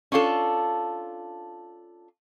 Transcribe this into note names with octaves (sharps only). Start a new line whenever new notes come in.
C#4 D4 F4 A4